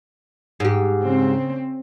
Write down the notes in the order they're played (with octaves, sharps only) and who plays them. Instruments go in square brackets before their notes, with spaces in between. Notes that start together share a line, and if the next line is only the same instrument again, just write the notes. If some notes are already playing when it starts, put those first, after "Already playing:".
[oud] G#2 G4
[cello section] C#3 C4